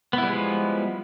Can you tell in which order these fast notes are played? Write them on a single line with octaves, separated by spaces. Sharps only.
B3 E4 G3 G#3 F3